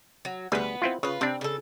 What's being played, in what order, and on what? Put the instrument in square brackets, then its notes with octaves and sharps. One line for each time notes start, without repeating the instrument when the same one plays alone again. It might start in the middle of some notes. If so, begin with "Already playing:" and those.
[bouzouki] F#3
[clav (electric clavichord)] D2 G3 G#4 [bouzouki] B3 B4
[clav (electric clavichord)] C4 E4 F4
[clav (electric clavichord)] C#3 [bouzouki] F4 B4
[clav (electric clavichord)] C3 D4 [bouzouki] C4
[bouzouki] C#3 A4